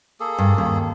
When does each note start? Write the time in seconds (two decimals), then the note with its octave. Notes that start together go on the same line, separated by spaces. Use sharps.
0.20 A#3 G#4 A4
0.38 G2
0.58 D#2